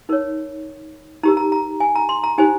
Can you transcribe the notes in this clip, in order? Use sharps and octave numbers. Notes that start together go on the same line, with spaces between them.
D#4 A#4 C#5
D#4 G4 A#4 A#5
A#5
A#5
G#5
A#5
C6
A#5
D#4 G4 C5 G#5